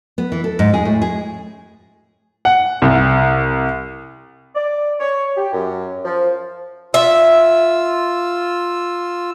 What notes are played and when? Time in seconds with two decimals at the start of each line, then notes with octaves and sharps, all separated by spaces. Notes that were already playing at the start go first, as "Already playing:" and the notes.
0.18 B3
0.32 E3
0.44 A4
0.59 G#2
0.74 G#4
0.85 A2
1.02 G#4
2.45 F#5
2.82 C2
4.55 D5
4.99 C#5
5.37 G4
5.52 F#2
6.04 F3
6.94 F4 E5 E6